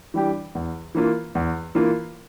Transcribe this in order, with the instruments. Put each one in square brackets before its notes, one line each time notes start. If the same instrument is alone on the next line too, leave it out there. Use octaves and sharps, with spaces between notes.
[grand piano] E3 G3 D4 G4
E2
E3 A#3 F4
E2
E3 A#3 F4